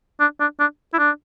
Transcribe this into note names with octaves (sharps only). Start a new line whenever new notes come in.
D4
D4
D4
E4
D4